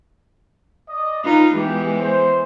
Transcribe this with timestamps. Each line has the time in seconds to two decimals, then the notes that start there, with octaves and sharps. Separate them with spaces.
0.89 D5 D#5
1.24 D#4 F4 B4
1.54 E3 G#3 B3 G4
2.00 C5